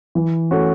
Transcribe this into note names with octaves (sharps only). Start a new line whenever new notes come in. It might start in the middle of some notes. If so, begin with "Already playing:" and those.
E3
A3 C#4 F#4